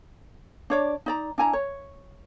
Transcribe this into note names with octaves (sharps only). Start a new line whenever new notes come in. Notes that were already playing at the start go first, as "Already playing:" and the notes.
D4 C#5 D5
D#4 D5 A#5
D4 E4 G#5 A#5
C#5